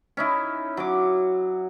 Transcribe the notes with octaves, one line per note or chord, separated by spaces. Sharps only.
C#4 D#4 E4
F#3 D6